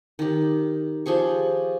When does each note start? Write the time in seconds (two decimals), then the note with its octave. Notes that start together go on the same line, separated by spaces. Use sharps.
0.19 D#3 G4
1.06 F3 G4 G#4 C#6